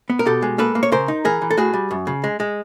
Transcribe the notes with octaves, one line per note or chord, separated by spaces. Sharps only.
B3
A#4
B2 G4 A4
G#3
A#3 A4 B4
A#3
C#5
C#3 A#4 C5
D#4
E3 G#4 A#4
E3
A4
A2 F#4 G#4
G3
F#2
C#3
G#3
G#3